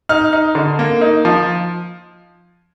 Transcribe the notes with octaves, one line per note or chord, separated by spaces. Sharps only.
D#4 F6
D#4
D3
A#3
D#4
F3